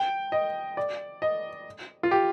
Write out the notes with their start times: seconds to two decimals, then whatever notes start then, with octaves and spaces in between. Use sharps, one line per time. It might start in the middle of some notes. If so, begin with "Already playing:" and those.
Already playing: G5
0.32 D#5
0.77 D5
1.22 D#5
2.03 F4
2.11 G4